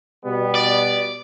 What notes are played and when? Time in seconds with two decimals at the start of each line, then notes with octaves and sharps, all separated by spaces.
0.25 B2 G3 B3
0.55 D5